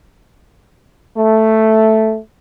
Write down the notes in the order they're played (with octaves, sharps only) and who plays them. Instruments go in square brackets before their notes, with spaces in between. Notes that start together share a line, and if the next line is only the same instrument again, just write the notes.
[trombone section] A3